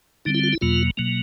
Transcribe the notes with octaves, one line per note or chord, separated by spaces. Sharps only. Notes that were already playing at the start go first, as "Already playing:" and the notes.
D3 G3 C4 D#4
E4
F4
E4
E2 B2 F#3 A#3 F4
B2 F#3 A#3